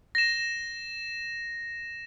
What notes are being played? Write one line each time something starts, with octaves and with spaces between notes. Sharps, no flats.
A#6 E7